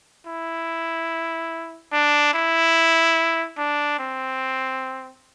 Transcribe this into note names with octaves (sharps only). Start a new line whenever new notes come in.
E4
D4
E4
D4
C4